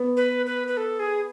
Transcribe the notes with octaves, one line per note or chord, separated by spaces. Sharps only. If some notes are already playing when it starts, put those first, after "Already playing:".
Already playing: B3
B4
B4
B4
A4
G#4